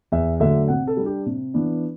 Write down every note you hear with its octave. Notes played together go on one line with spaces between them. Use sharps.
E2 E5
D3 F#3 A3 D4 E5
C3 F#5
A4
G3
D4 G4
C3
E3 B3 D4